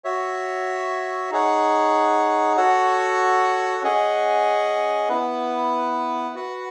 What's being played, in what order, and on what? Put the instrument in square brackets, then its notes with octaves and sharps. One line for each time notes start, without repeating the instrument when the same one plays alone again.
[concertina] F#4 C#5 E5
D#4 G#4 C#5 F#5
F#4 A4 C#5 F#5
C#4 G#4 D#5 F#5
B3 E4 B4
F#4 B4 F#5